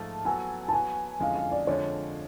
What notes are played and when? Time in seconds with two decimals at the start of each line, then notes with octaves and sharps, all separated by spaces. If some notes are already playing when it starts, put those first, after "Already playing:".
Already playing: G#2 F3 A3 F4 A5
0.25 F#3 B3 F#4 A4 G#5
0.68 A5
0.72 F#3 B3 F#4 G#5
1.20 F2 D3 F3 G#3 C#4 F5
1.35 F5
1.51 D5
1.67 F2 D3 F3 G#3 C#5